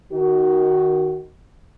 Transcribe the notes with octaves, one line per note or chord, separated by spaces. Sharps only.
D#3 F#4